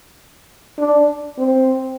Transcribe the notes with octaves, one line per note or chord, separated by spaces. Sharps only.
D4
C4